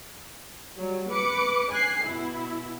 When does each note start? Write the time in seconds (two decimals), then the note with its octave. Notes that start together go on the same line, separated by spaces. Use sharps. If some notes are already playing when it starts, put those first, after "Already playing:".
0.77 F#3 G3
1.10 B4 D6 C#7
1.71 G#5 F#6 C7
2.05 B2 E4